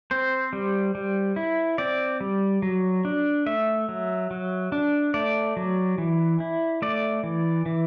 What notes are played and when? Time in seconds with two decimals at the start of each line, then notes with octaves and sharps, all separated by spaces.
0.11 C4 C5
0.53 G3
0.95 G3
1.36 E4
1.78 C4 D5
2.21 G3
2.62 F#3
3.05 D4
3.46 A3 E5
3.89 F#3
4.31 F#3
4.72 D4
5.14 A3 D5
5.57 F#3
5.98 E3
6.40 E4
6.82 A3 D5
7.23 E3
7.66 E3